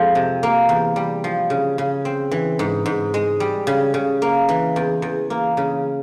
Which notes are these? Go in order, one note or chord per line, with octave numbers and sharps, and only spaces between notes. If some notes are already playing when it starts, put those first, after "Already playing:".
Already playing: F2 F3 G#3
C3
A#3
E2
G3
F3
C#3
C#3
C4
E3
G#2
G#2
G#3
G3
C#3
C#3
A#3
E3
E2
E2
A#3
C#3